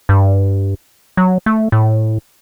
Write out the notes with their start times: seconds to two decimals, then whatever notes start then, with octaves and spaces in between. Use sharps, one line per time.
0.09 G2
1.17 F#3
1.46 A3
1.72 A2